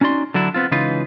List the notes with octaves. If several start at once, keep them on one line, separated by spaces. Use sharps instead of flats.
C#4 D#4 F#4 D5 C6
D3 F#3 D4 E4
B3 C4 F4
C#3 E3 G#3 D#4 F4 B4